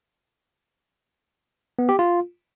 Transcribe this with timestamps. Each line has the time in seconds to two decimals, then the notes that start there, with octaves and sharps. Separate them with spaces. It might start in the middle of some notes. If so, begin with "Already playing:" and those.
1.79 B3
1.89 G4
1.99 F4